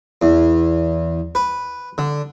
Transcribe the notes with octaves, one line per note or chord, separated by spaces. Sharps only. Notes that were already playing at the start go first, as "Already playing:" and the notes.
E2
B4
D3